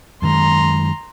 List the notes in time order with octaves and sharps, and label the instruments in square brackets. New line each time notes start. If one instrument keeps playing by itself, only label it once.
[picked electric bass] F#2 D#3 G#3 [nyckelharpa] A#5 C6